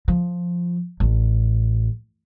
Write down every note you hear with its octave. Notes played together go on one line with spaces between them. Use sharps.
F3
A1